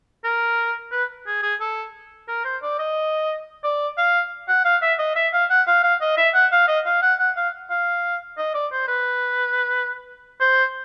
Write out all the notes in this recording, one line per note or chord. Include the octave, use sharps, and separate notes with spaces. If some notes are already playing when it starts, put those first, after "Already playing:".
A#4
B4
G#4
G#4
A4
A#4
C5
D5
D#5
D5
F5
F#5
F5
E5
D#5
E5
F5
F#5
F5
F5
D#5
E5
F#5
F5
D#5
F5
F#5
F#5
F5
F5
D#5
D5
C5
B4
C5